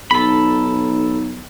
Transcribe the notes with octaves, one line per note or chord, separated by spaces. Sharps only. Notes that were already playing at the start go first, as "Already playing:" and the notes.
B1 D#4 A4 B5